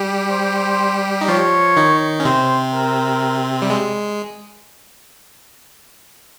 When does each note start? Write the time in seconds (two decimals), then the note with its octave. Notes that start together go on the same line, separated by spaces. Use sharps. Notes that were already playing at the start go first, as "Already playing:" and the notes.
Already playing: G3 G4
0.31 C5
1.21 D#4
1.28 F3 F4 C#5
1.77 D#3 D#4
2.20 C#4
2.25 C3 C4 C5
2.74 A#4
3.62 G3
3.70 G#3